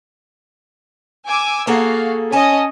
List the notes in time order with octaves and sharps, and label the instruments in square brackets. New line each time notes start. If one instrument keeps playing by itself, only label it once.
[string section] G#5 D6 E6
[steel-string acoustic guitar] A#3 G#4 A4 [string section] F#4 F5
[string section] C#4 D#5 [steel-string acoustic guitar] G#5 A5